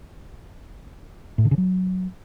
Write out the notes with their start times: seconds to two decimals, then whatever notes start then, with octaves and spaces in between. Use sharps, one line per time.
1.38 A2
1.45 D3
1.51 C#3
1.58 F#3